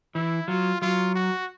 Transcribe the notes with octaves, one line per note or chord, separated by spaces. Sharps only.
E3 E4
F#3 F4
F#3 F4
F#4